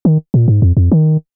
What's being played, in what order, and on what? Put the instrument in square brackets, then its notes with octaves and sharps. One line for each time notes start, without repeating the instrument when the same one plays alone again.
[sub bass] D#3
A#2
G#2
F2
F2
D#3